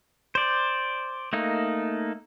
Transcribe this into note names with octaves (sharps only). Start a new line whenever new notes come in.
C5 D5
A3 A#3 D#4